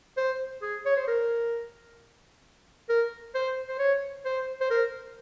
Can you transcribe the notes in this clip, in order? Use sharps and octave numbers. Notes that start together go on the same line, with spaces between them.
C5
G#4
C#5
C5
A#4
A#4
C5
C5
C#5
C5
C5
A#4